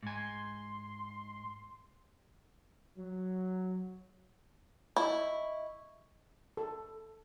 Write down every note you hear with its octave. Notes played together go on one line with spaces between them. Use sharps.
G#2 G#5 C6
F#3
E4 D#5 C#6
A4